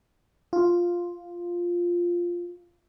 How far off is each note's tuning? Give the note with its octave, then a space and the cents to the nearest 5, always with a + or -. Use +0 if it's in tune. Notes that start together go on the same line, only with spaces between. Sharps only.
F4 +0